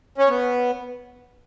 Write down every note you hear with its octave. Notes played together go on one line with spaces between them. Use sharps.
C#4
B3